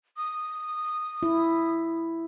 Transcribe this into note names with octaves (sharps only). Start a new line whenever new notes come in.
D#6
E4